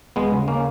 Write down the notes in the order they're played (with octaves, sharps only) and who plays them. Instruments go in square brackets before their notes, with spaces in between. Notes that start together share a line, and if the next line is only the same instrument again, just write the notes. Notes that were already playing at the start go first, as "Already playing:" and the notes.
[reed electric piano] D#2 [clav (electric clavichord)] G#3 B3
[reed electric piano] C#3
[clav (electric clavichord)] A#3 C#4